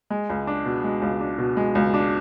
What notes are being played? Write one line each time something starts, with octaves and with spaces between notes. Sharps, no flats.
G#3
C#2
D4
B2
G#3
C#2
D4
B2
G#3
C#2
D4